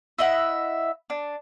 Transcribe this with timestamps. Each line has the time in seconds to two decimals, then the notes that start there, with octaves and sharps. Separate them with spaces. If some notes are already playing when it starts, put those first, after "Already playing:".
0.18 E4 D#5 E5 F#5
1.10 D4